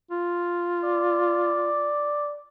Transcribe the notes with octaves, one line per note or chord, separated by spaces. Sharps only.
F4
D5